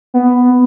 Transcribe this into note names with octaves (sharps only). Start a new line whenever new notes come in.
B3